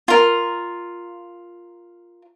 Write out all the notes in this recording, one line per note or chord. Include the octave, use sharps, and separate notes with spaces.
F4 A#4